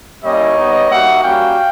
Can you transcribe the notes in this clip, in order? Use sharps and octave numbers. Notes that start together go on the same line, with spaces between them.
G3 A#3 C#4 E4 C#5 D#5
G3 B3 D#4
G3 A#3 D#4 F#4 E5 F#5
G3 A#3 C#4 F#4 F5 G5